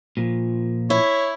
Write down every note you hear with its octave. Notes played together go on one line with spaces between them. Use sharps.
A#2 F3
E4 C#5